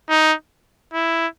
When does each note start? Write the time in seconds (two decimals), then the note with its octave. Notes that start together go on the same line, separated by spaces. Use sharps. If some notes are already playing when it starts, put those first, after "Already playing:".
0.09 D#4
0.93 E4